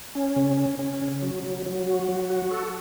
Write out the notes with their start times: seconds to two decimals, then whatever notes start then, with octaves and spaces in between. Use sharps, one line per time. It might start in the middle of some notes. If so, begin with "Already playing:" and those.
0.15 C#4
0.36 C#3
0.57 C#4
0.79 C#4
1.01 C#3
1.22 F#3
1.44 F#3
1.66 F#3
1.87 F#4
2.09 F#3
2.30 F#4
2.51 A4